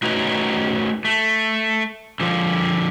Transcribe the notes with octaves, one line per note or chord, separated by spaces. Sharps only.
A3 D#4 F#4 B4 C#5 A#5
A3
D3 F3